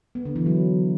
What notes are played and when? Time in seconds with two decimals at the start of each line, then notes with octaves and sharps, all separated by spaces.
0.15 B3
0.25 D3
0.36 E3
0.46 F#3